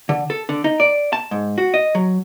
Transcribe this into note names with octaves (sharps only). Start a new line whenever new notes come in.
D3
A4
D3
D#4
D5
A5
G#2
F#4
D#5
F#3